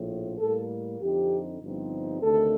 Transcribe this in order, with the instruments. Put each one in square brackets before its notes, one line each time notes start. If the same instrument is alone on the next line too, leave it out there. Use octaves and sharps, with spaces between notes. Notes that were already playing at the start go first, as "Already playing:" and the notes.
Already playing: [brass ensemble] A#1 A2 F3
A2 G3 A#3 A4
F2 D3 F3 C4 D#4 G4
G1 G2 F3 C4 D#4
D2 C3 D#3 A3 D4 A4